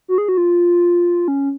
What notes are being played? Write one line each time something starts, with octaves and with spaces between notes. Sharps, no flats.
F#4
G#4
F#4
F4
C#4